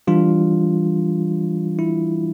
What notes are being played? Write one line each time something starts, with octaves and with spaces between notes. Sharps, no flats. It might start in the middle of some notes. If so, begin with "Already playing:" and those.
E3 G3 D4 F4
E4